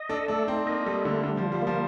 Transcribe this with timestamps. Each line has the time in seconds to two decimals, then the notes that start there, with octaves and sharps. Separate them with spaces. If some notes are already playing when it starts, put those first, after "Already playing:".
Already playing: D#5
0.09 D4 A4
0.28 A3 D4
0.47 C4 D#4
0.67 A#3 D#5
0.85 G3 A4
1.05 D3 A3
1.23 D3 G3
1.37 F3
1.43 F4
1.52 G3
1.62 F3 A#3